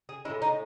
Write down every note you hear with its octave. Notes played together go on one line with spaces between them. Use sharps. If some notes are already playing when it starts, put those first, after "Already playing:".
G#4
A2 E3 G#3 E4
D#4